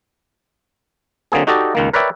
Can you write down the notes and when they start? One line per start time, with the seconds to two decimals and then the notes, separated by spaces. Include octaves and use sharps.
1.32 D3 F#3 A#3 C4 G#4
1.47 D#4 F#4 G4 A4 D5 D#5
1.75 C#2 D#3 A#3
1.93 A#4 B4 C#5 D5 E5 G5